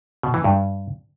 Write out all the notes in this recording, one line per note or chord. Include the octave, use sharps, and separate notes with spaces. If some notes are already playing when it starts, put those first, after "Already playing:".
B2
E3
G2